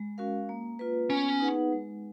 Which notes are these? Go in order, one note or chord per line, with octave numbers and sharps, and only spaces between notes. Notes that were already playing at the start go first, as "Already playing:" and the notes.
Already playing: G#3
C#4 F#4 A#4 F5
A#3
F4 B4
B3 C#4
D#4 G#4 B4 F#5
G#3